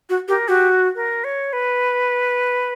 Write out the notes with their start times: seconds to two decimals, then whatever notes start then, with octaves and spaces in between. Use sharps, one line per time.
0.10 F#4
0.28 G4 A#4
0.48 F#4 G4
0.95 A#4
1.24 C#5
1.53 B4